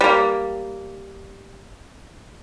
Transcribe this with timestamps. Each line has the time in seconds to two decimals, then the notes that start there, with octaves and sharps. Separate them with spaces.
0.01 G3 A#3